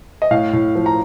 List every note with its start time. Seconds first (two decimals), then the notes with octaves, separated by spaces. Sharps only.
0.22 D#5
0.31 A2 F5
0.53 A2
0.75 F3
0.86 A#5